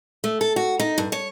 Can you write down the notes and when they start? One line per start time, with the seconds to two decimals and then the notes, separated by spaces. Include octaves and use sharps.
0.24 A3
0.41 A4
0.56 F#4
0.79 D#4
0.98 G2
1.12 C#5